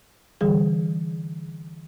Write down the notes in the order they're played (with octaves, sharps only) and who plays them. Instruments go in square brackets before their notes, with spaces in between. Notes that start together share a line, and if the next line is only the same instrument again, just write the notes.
[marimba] D3 E3 G3 G#4